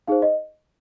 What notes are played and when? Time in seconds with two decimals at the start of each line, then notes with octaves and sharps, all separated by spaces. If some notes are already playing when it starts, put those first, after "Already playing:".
0.07 D#4 G#4 C5 F5
0.22 D#5